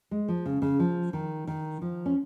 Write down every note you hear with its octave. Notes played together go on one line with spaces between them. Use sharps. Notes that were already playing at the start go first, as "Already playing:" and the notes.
G#3
F3
C#3
C#3
F3
D#3
D#3
F3
C#4